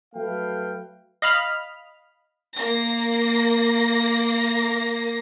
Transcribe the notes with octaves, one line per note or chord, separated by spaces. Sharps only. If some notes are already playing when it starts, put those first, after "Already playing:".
F#3 A3 B4 F5 G5
D#5 F5 B5 F6
A#3 A#6